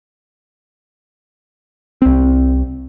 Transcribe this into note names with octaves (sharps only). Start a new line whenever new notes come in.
C2 C4